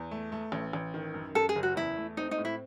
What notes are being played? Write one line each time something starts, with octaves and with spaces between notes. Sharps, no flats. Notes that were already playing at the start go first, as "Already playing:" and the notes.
Already playing: E2
A3
A3
A1
A1
D#3
F#2
F#2 A4
G#4
F#1
F#4
E2 E4
A3
C4 D#4
D#4
A2
E4